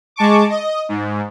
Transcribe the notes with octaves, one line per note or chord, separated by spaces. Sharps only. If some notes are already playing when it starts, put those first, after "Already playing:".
G#3 A5 C#6 D6
D#5
G#2